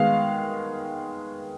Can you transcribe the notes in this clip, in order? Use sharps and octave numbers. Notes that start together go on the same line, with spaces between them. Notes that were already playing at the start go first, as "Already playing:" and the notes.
Already playing: D#3 G#3 B3 F5